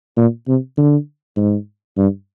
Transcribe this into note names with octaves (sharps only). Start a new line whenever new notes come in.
A#2
C3
D3
G#2
G2